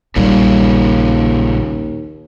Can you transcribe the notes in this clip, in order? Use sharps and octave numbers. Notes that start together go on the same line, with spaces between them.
A#1 D#2 A#2 C#3 G3